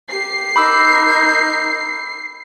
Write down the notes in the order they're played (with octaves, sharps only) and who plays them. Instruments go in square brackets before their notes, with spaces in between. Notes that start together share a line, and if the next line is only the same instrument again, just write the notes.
[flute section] G4 [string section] C7
[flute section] D#4 A#4 G6 [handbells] B5 D6 E6